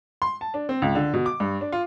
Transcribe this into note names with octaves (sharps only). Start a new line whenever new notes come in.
C6
A5
D4
C4
C#2
D3
B2
D6
G2
D4
F4